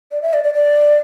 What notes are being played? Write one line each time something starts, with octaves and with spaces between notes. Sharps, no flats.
D5
E5
D5
D5
D5